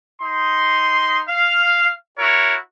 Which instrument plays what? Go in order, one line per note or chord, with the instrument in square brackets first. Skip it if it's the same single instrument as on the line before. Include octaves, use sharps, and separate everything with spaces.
[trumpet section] D#4 C6
F5
E4 F#4 A#4 C#5